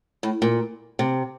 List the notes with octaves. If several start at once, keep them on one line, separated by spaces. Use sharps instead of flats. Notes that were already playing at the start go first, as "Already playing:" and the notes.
A2
A#2
C3